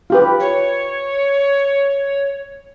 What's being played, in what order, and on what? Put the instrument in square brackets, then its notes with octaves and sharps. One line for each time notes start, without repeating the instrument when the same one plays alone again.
[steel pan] F4 G4 B4
[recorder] C#5